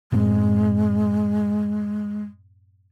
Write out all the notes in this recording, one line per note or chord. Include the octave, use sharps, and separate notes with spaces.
F#2 A2 G#3 C4